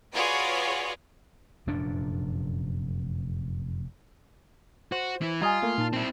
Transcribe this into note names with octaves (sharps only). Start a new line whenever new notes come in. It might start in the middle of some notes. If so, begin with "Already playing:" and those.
F4 F#4 G#4 B4 C#5 D5
F1 F#2 A#2 D4
F#4 C5
E3 E4
G3 F4 D#5 G#5 A#5 D#6 G#6
A3 A#3
A#2 D#4 A5
C4 E4